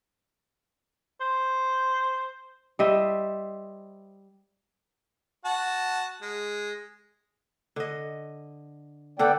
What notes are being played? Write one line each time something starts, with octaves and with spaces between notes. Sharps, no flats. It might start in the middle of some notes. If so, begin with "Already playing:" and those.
C5
G3 C5 D#5 E5
F#4 F#5 A5
G#3
D3 D#5
D3 B3 A4 D5 F#5 G5